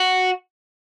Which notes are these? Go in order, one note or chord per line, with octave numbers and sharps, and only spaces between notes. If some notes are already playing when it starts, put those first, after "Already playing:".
Already playing: F#4